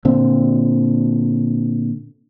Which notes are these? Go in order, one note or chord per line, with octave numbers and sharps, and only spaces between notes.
A#2 D3 C4